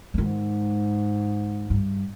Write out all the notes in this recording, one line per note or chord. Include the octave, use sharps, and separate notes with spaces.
G#2 D#3 G#3
G2